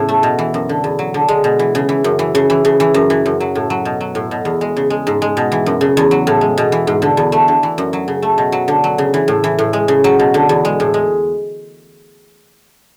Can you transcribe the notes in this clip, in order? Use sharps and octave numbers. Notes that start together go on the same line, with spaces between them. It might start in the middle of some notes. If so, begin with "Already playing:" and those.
Already playing: E2 A2 C#3
A3
B2
E3
F#2
D3
E2
F#3
D3
G#3
B2
E3
C#3
E3
F#2
E3
C#3
E3
C#3
E3
F#2
E3
F#2
F#3
A2
F#3
B2
F#3
A2
B2
E2
G#3
C#3
G#3
G#2
G#3
B2
E3
F#2
C#3
E2
F#3
A2
G#3
B2
E3
G#2
D3
E2
A3
D3
E3
F#2
F#3
C#3
A3
B2
F#3
D3
F#3
C#3
E3
A2
E3
A2
G#3
C#3
F#3
B2
D3
E2
G#3
A2
G#3